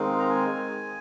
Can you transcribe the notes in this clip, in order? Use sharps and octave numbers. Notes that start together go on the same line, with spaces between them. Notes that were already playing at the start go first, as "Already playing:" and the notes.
Already playing: D#3 G#3 C4 D#4 F5
A#5
G#5